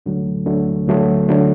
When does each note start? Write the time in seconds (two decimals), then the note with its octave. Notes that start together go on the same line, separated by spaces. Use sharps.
0.06 D2 D3 F#3 A3
0.46 D2 D3 F#3 A3
0.88 D2 D3 F#3 A3
1.29 D3 F#3 A3